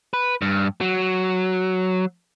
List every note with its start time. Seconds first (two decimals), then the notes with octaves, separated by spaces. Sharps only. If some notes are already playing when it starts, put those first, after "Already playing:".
0.14 B4
0.42 G2
0.81 F#3